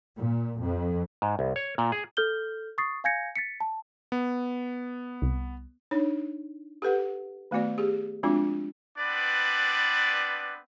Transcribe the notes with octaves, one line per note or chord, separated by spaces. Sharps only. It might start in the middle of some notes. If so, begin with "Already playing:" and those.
A#2
F2
G#2
C2
C#5
A#2
G#4
A4 F6 G6 G7
C#6 D#6 A6 C7
F5 G#5 G6 G#6 A#6 C#7
A6 B6 C#7
A5
B3
C2
D4 D#4 C#5
G4 A4 B4 F#5
D#3 A3 B3 F#4 D5
G4 G#4
F3 G#3 C4 D4 F4 F#4
B3 C4 D4 B4 D5